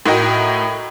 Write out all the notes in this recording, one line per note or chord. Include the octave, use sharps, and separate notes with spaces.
A2 E4 F#4 A#4 D#5 G5